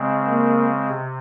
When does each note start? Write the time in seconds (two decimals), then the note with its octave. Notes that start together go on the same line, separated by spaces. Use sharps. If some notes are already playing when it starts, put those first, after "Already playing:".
Already playing: C#3 G#3 C4
0.26 A#3
0.90 C3